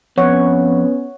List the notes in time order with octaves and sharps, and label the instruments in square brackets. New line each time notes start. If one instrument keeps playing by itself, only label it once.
[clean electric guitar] F2 [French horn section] B3 C#4 [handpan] C#5 F#5